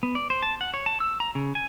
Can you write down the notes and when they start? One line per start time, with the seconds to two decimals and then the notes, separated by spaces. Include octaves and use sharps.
0.03 B3
0.15 D5
0.30 C5
0.43 A5
0.61 F#5
0.74 C#5
0.86 A5
1.00 E6
1.20 A#5
1.35 C#3
1.55 G#5